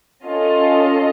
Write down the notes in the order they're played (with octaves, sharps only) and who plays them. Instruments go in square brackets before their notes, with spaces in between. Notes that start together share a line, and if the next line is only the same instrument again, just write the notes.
[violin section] C#4 F4 A4 D#5